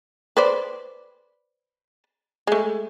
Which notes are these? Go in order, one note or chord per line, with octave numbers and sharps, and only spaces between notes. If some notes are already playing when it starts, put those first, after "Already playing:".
B4 C5 D5
G#3 A3